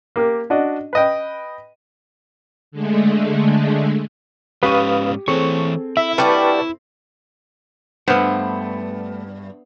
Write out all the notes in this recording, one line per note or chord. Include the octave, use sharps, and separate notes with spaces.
A#3 G4 A#4
D4 F#4 D5 D#5
B4 D#5 G5
D3 G#3 A3
G#2 C#4 G4 B4 F5 C#6 D#6 D#7
E3 C4 G#4 A4 C#5 C#6
E4 E5
G3 D4 F#4 B4 A5 C#6
G2 A3 B3 C5 F#5